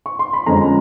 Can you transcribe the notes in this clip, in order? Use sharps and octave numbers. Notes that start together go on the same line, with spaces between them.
C#6
C6
B5
F2 D3 F3 G#3 C#4 A#5